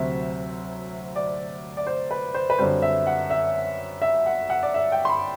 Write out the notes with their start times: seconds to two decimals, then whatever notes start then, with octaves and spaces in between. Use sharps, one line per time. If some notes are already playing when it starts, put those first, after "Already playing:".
Already playing: D2 C3 F#3 C4 E5
1.16 D5
1.77 D5
1.87 C5
2.11 B4
2.34 C5
2.50 B4
2.58 F#2 D3 G3 C4 C5
2.82 E5
3.07 F#5
3.30 E5
4.02 E5
4.26 F#5
4.50 F#5
4.63 D5
4.74 E5
4.92 G5
5.05 C6
5.09 B5